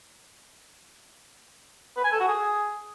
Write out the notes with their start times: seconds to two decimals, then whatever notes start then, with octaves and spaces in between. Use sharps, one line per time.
1.96 B4
2.04 G#5
2.12 A4
2.20 F#4
2.28 G#4